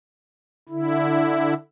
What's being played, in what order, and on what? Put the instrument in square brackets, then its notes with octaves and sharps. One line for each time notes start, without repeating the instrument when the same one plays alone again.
[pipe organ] D3 E4